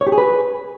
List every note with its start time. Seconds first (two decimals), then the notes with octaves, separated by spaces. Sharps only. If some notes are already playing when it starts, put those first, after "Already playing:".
0.01 C#5
0.07 G4
0.12 G#4
0.18 B4